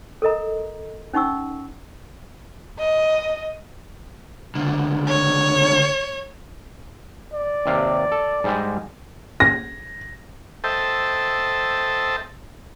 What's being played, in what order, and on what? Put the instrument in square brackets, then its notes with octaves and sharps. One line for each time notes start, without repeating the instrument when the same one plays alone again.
[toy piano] A4 A#4 D#5 A#5
C#4 D#4 F#5 C#6 E6
[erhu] D#5
[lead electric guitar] C#2 D3
[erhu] C#5
[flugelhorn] D5
[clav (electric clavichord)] D#2 C3 F5
A4
G#2 G3 G#3
[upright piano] A#6
[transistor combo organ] A4 C5 D#5 E5 G5 A5